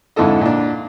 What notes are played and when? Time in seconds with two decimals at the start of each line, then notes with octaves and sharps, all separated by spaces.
0.16 F2 G#2 D3 E4 A4 D#5
0.41 A#2 D4